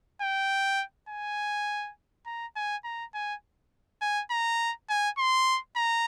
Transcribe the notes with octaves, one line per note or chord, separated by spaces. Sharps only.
G5
G#5
A#5
G#5
A#5
G#5
G#5
A#5
G#5
C6
A#5